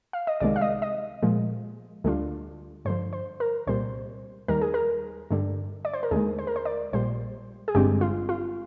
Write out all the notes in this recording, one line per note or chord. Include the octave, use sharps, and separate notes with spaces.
F5
D#5
C2 C3 D#3 G#3 D5
F5
D#5
D#5
A#2 F3 G#3
D2 D3 G3 D4 F4
G2 D3 F3 C5
C5
A#4
C2 A#2 G3 C5
D#2 D#3 G3 A#4
G#4
A#4
G2 D3 G3
D5
C5
A#4
D#2 D3 G#3 G#4
C5
A#4
C5
D5
A#1 A#2 G3 C5
G#4
G1 G2 D3 G#3 C4 G4
F4
F4